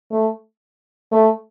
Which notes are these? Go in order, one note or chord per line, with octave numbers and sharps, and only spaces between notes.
A3
A3